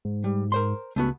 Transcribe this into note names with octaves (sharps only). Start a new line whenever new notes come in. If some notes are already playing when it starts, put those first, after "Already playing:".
G#2
G3
A#4 C5 C6
C#2 A3 B3 F#4